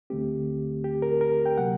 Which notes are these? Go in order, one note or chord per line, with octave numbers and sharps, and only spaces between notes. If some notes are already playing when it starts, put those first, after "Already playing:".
D2 D3 A3 C4 G4
G4
A#4
A#4
G5
C3 F#3 A#3 F#5